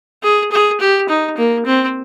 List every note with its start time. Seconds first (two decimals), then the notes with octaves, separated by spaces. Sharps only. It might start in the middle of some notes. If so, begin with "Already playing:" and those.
0.23 G#4
0.51 G#4
0.80 G4
1.09 D#4
1.37 A#3
1.65 C4